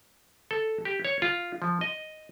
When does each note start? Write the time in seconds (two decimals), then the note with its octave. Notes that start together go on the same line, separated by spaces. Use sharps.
0.51 A4
0.85 G4
1.05 C#5
1.22 F4
1.62 F3
1.81 D#5